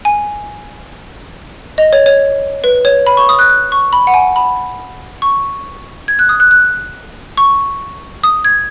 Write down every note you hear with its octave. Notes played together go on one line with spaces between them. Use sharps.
G#5
D#5
C#5
C#5
B4
C#5
B5
C#6
D#6
F#6
F#6
C#6
B5
F#5
G#5
B5
C#6
G#6
F#6
D#6
F#6
F#6
C#6
D#6
G#6